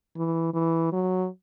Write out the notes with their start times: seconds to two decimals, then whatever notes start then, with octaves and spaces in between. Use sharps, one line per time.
0.17 E3
0.54 E3
0.92 F#3